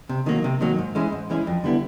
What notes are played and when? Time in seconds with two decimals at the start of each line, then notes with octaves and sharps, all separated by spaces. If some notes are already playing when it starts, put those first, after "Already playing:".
0.09 C3
0.26 D#3 F#3 A#3
0.44 C3
0.61 D#3 F#3 A#3
0.79 G#2
0.95 E3 G#3 C#4 E4
1.12 G#2
1.30 E3 G#3 C#4 E4
1.47 F2
1.64 D3 G3 B3 E4